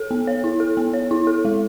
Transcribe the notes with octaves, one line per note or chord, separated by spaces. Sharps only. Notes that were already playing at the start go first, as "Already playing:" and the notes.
Already playing: A4
B3
C#5
E4
A4
B3
C#5
E4
A4
G#3